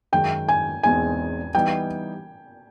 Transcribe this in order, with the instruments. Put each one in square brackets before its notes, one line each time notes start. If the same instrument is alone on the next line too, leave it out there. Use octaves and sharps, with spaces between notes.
[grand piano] F#2 D#3 G#3 [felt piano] G5
[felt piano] G#5
[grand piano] E2 B2 G#3 C4 D#4 [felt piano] G#5
[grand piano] E3 G3 B3 D#4 [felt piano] G5